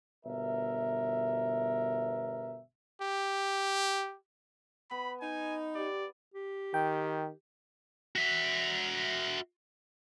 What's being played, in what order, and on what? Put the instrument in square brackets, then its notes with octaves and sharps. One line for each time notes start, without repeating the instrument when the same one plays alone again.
[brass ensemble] G1 B2 A#4 E5
[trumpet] G4
[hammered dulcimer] B3 [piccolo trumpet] B5
[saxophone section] D#4 [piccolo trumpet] G#5
[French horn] G4 [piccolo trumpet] D5
[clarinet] G4
[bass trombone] D#3 [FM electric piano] G5
[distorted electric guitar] F#4 E5